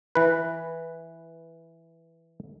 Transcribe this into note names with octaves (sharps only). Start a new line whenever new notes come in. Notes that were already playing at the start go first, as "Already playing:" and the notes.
E3 B4